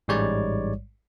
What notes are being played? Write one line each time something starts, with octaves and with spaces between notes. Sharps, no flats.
A1 G#2 G3 G#3 C#5 D5